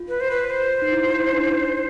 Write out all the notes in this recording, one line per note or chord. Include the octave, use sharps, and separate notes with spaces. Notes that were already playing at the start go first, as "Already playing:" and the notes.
Already playing: F4
B4
C5
B4
C5
D#4
E4
F4
E4
D#4
D4